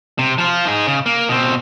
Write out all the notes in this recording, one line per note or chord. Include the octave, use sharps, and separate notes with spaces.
C3
F3 F4
D#4 G#4
C#3
A#3
B2 C4